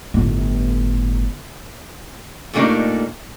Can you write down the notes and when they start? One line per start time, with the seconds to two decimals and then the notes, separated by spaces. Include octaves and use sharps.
0.14 G1 A2
2.53 A#2 G3 A3 A#3 D4 D#4